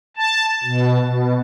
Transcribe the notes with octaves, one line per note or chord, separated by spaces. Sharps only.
A5
B2
B2